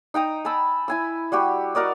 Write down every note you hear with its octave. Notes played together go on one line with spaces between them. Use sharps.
D#4 G5 A#5 D#6
G#5 A5 B5 E6
E4 G#5 E6
G3 F#4 G4
F#4 A#4 D5 D#5